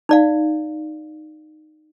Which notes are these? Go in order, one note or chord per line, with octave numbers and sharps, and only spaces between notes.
D#4 D5 F5